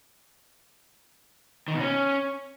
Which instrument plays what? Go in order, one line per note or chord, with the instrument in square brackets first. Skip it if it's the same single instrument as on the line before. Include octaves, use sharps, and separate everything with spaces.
[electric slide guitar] D#3
B2
C#4